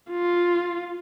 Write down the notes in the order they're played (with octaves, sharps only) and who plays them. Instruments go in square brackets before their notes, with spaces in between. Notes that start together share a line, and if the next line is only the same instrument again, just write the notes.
[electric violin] F4